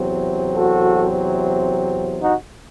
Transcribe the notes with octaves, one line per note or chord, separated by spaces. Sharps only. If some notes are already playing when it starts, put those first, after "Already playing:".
Already playing: E2 C3 F#3 C4
F#4 A4
D#4 F#4